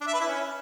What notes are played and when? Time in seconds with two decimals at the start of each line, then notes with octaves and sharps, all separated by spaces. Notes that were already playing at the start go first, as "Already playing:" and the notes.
0.01 D4
0.07 E5
0.14 B4
0.20 E4
0.27 C#4